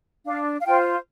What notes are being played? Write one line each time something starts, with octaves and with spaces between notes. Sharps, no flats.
D4 F5
F5
F4 C5 G5